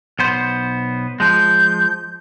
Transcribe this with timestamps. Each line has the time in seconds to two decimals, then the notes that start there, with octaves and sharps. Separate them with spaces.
0.19 B1 B3 C5
1.20 F3 G#3 G6